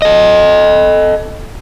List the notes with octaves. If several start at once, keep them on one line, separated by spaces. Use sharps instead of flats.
A4 D#5